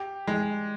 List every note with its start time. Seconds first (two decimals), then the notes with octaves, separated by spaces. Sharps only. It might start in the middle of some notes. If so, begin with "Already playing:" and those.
Already playing: G4
0.27 G#3